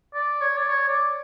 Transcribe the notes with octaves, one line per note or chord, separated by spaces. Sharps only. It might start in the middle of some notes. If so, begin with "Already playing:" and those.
D5
C#5
D5
C#5
D5